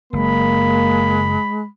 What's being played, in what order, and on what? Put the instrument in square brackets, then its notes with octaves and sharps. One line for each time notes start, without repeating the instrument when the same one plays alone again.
[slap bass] F#1 [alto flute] G#3 [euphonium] A#3 [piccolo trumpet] B5